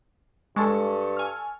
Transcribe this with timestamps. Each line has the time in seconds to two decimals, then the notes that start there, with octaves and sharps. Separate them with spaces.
0.56 G2 G#3 A4 A5 C#6
1.17 G#5 F6